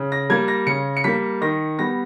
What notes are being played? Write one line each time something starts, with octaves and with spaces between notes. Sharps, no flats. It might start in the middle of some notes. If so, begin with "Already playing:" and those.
Already playing: C#3
A#6
G3 A#3 G#6
A#6
C#3 C#7
C#7
G3 A#3 B6
D#3 A#6
G3 B3 A#6